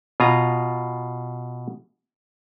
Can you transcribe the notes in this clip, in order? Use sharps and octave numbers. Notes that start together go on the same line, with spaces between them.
B2 F4 G#5 A#5